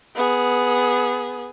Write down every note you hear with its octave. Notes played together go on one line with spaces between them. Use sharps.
B3 G#4